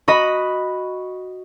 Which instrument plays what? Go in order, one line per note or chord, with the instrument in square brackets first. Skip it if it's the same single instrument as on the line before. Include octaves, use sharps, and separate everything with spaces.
[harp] F#4 D#5 B5